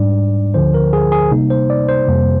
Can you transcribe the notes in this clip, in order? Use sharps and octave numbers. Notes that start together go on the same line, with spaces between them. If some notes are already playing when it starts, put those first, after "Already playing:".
Already playing: G#2 G3 D4 D5
D2 D3 F3 C5
A#4
G#4
G#4
C3 G3 A#3 D#4
C5
D5
C5
F2 C3 G3 A#3